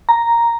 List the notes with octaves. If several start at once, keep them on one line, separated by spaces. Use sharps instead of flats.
A#5